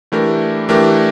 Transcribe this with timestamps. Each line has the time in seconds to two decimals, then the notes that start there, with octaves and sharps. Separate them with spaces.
0.12 E3 A3 D4 G4 A#4
0.69 E3 A3 D4 G4 A#4